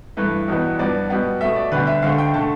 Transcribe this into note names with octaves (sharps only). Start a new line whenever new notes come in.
G2 E3 A3 B4
E2 B2 G3 B3
G2 F3 B3 D5
B2 G3 B3
B2 A3 E5
D5
D2 D3 G3 B3 B4
E5
D2 D3 A3 F5
G5
D3 A3 A5